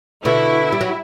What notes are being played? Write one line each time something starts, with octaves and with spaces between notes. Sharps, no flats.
B2 D3 E4
G3
F#3